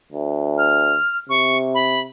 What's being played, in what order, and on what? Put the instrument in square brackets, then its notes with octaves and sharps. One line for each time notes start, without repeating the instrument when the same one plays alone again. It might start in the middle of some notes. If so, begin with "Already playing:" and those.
[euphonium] D2
[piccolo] F6
[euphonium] C3 [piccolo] C#6
[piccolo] B5